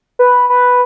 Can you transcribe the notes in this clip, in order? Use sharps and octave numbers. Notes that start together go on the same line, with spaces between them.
B4
B4